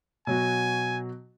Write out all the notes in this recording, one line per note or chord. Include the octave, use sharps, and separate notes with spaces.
B2 F#3 F#4 G#5